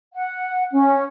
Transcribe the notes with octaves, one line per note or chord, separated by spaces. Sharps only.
F#5
C#4